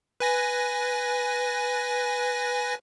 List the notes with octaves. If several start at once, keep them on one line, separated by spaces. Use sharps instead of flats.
B4 G#5 A#6